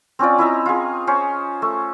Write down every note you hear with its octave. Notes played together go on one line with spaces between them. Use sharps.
C4 C#4 F4 D5
E4 D#5 E5 A#5
F4 G#4
C#4 C5
A3